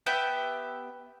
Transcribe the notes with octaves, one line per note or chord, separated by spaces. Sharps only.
B3 G4 E5 G5